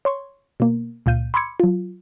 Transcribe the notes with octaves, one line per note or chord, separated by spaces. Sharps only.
C#5 C6 C#6
B2 A#3
C#2 A#2 F5 G6 D#7
B5 C6 D6 E6 G#6 C#7
F#3 F4